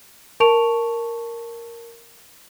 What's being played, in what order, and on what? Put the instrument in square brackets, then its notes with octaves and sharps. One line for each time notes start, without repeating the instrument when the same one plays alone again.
[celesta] A#4 A5 C#6 D7 F7